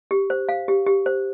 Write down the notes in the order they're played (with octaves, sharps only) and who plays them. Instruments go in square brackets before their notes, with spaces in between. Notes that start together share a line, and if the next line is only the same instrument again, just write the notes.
[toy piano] G4
C5
F5
G4
G4
C5